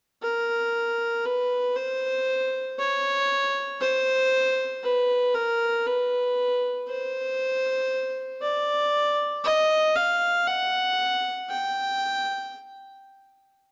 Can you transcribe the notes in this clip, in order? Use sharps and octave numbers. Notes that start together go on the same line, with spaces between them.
A#4
B4
C5
C#5
C5
B4
A#4
B4
C5
D5
D#5
F5
F#5
G5